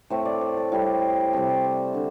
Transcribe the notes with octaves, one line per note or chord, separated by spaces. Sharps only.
A2 A3 C4 C5
D5
C5
A4
A2 G3 C4
C3 G3 C4 A4
D5
C5
D3